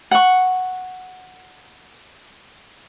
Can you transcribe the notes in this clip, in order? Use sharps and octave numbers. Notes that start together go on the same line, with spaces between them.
F#5 C#6